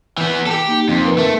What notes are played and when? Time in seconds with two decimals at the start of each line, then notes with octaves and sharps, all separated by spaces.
0.18 E3 B3 G6
0.46 G4 A4
0.66 A#3 D#4
0.89 F2
1.05 A#4 B4
1.18 A3